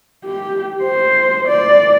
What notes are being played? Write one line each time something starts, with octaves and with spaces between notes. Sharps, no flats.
G4
C5
D5